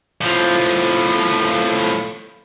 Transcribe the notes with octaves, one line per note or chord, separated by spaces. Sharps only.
A2 F3